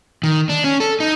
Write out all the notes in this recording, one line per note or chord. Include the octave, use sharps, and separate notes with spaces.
D#3
D4
C#4
A4
D#4